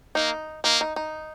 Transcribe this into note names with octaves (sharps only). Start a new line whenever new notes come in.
A#3 D#4
A#3 D#4
D#4
D#4